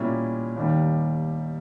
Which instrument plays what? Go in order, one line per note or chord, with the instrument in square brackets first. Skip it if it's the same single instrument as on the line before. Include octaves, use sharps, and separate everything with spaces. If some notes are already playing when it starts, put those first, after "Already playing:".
Already playing: [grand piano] A#2 G3 C#4 E4
D#2 D#3 G3